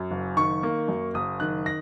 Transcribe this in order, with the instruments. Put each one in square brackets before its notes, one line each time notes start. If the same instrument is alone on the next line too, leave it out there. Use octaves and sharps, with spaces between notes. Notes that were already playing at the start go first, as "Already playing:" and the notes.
Already playing: [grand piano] F#2
F#1
D#3 C#6
A#3
F#2
F#1 D#6
D#3 F#6
A#6